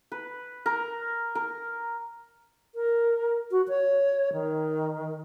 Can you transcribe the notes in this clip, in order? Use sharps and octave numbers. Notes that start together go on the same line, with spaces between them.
B4
A#4
A#4
A#4
F#4
C#5
D#3